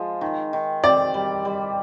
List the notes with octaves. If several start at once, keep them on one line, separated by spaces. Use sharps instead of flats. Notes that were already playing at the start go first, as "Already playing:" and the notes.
Already playing: F3 G#3
D#3
D#3
C4 D5
G3
G3